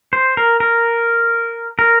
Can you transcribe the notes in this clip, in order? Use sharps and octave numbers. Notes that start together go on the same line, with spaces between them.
C5
A#4
A#4
A#4